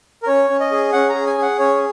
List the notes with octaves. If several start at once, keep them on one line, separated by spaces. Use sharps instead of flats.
A#4
C#4 C#5
C#4
D#5
G#4
C#4 F#5
A#5
G#4
G#5
G#4 F#5
C#4 C#5